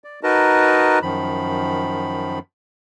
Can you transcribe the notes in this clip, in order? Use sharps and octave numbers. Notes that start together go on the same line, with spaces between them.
D5
D#4 F#4 A#4 B4 D#5 A5
F#2 D#3 F3 B5